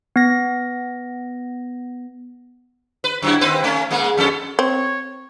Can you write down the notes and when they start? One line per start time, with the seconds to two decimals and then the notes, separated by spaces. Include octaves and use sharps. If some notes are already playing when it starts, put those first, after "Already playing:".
0.16 B3 A#6
3.04 B4
3.22 F#2 F#3 E4
3.41 D#2 C4 B4
3.64 A3 C#4
3.91 G#2 G#3 A#3
4.18 F2 C#4 A4
4.59 C4 C#5